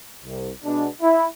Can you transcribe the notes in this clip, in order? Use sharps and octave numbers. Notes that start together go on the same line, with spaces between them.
C2
B2 G#3 B3 D4
E4